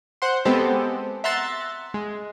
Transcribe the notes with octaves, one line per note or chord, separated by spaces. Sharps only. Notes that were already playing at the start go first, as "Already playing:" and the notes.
C5 F#5 C6
G#3 B3 C4 G4 A4 C5
E5 F#5 A#5 C6 F#6 A6
G#3